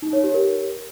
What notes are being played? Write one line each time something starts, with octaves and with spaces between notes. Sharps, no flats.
D#4
C#5
G4
A#4